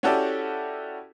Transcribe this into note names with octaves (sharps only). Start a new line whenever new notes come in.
C#4 E4 F#4 G4 A4 D5